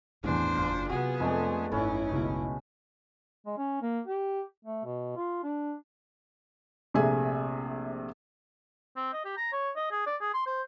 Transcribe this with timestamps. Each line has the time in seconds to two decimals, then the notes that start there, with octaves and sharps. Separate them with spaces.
0.24 A1 E2 G2 D#3 D4 C5
0.55 F#1 F4
0.90 C3 F#3 B3 F#4 G#4
1.20 F2 G#3 A3 D4
1.72 G#1 F#2 C#4 D#4 E4 A4 B4
2.12 C#2 B2
3.46 G#3
3.58 C#4
3.82 A#3
4.07 G4
4.65 A3
4.84 B2
5.16 F4
5.43 D4
6.94 A#1 C3 A3 G#4 E5 G#5
8.97 C4
9.13 D#5
9.25 G4
9.37 A#5
9.53 C#5
9.76 D#5
9.92 G#4
10.06 D5
10.21 G#4
10.34 C6
10.46 C5